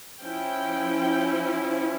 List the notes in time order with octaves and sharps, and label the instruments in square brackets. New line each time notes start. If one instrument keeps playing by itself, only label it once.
[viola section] F3 C#4 E4 G5